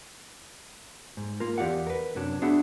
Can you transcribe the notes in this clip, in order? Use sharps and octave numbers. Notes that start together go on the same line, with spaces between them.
G#2
A#3 F4 A#4
E2 G4 D5 F5 F#5
A#4 B4
F#2 C3 F#3 D4
B3 D4 F#4 G#4 E5 F#5